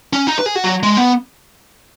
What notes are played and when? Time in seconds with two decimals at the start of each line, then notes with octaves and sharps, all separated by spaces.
0.13 C#4
0.27 D#4
0.39 B4
0.46 G#4
0.55 F#4
0.64 F#3
0.83 G#3
0.97 B3